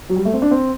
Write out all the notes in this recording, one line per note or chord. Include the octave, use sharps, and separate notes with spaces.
F#3
G3
A3
C4
D4
C4